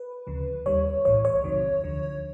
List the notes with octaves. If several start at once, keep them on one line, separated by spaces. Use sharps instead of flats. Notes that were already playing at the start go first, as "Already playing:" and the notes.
Already playing: B4
D2 C#3 F3
D#2 D#3 G3 C#5
B1 A2 E3 C#5
C#5
E2 C3 D#3 F#3
D2 D3 F3